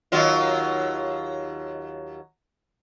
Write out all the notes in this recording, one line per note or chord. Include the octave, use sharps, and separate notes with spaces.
D#2 F#3 F4